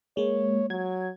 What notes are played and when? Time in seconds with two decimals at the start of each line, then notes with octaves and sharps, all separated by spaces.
0.17 G#3 A#3 C#5
0.70 F#3 G#6